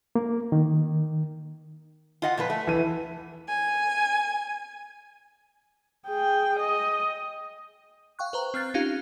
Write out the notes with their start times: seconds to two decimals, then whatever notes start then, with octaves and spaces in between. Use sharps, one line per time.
0.16 A#3
0.52 D#3
2.22 F4 D#5 F#5
2.37 A#2 F3 B4
2.50 A3
2.67 E3 D#7
3.49 G#5
6.07 G#4 G5
6.60 D#5
8.19 F5 G5 C#6 F#6
8.33 B4 C5 A#5
8.54 C4 F6 F#6 A6 C7
8.74 C#4 D#4 F4 G4 F5